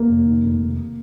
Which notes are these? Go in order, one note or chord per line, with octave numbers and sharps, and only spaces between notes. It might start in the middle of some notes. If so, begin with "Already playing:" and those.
Already playing: D#2 A#3
F1
D#3
F1
D#2